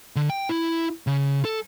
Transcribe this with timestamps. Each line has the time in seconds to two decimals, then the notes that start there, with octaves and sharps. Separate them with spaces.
0.16 D3
0.30 G5
0.49 E4
1.07 C#3
1.45 A4